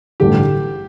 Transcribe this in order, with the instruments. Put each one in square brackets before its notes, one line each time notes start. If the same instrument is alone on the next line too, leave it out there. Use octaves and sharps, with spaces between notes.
[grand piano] A1 G2 D3 [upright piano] G4